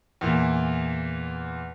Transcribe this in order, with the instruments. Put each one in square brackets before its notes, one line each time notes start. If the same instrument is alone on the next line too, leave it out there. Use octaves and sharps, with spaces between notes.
[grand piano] E2 A#2